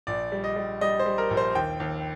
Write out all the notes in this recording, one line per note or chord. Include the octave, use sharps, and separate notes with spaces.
A#1 D5
G3
D#5
G3
G3 D#5
C5
G3
A#4
A#1
C5
D#2 G5
D#2